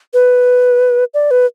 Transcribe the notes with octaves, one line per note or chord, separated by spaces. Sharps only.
B4
D5
B4